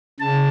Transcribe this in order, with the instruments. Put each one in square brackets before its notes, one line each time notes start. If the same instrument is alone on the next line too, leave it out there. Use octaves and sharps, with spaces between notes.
[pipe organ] C#3 A5